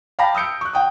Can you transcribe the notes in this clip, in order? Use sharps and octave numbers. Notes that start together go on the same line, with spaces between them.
F5 G5 A5 B5 D6 A#6
D#6 E6 G6 C#7 D7
C#6 F#6
F#5 G5 D#6